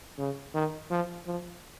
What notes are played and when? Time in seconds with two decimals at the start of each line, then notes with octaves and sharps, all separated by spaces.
0.18 C#3
0.55 D#3
0.90 F3
1.27 F3